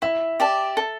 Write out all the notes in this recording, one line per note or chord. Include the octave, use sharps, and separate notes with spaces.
E4 E5
G4 D5 A5
A4